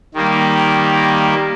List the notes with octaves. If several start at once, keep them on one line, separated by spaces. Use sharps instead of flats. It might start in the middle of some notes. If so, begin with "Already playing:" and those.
D#3 G3 A#3